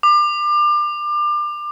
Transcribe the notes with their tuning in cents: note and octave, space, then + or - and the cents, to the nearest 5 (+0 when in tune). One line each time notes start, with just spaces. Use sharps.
D6 +30